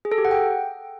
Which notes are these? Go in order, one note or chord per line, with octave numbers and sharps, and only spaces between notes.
G#4
A4
G4
F#5
G5